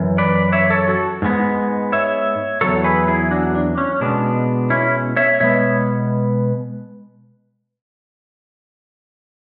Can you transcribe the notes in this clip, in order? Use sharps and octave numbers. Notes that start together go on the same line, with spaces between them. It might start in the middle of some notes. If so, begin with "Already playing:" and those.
Already playing: F#2 E3
B4 D5
C#5 E5
A4 C#5
F#4 A4
G#2 G#3 B3
C#5 E5
E2 B2 F#3 A4 C#5
G#4 B4
E4 G#4
D4 F#4
D4
C#4
B2 G#3 B3 D4
C#4 E4
C#5 E5
B2 G#3 B3 C#5 E5